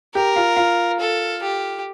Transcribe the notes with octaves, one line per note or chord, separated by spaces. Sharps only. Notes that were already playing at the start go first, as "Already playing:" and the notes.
G4 A#4
F4
F4
A4
G4